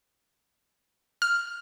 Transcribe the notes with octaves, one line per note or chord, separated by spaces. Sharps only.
F6